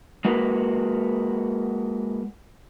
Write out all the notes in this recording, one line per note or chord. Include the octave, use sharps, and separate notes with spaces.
G#3 A#3 F#4 B4